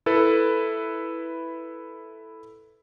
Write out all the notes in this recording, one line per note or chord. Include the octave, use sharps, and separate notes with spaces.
E4 A4 B4